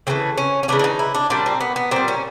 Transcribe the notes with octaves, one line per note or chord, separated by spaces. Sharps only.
C#3 E3 A3 C4
C#4
C#4
C#3 E3 A3 D4
D4
D#4
E4
D4
A#2 G3 D4
C4
B3
B3
A#2 G3 C4
C#4